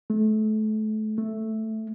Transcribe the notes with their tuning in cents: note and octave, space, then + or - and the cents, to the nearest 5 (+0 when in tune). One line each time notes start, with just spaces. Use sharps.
A3 -30
A3 +0